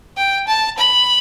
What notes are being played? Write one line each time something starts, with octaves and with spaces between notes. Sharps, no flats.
G5
A5
B5